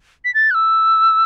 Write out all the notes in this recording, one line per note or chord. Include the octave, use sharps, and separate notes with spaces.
B6
A6
F#6
E6